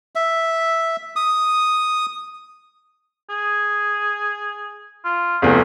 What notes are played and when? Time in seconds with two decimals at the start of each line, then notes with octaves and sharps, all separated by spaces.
0.15 E5
1.16 D#6
3.30 G#4
5.04 F4
5.42 F1 E2 C4